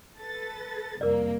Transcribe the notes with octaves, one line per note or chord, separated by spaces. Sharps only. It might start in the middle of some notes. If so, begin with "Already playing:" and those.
A4 B4 A6
C2 F2 A#3 A#4 D5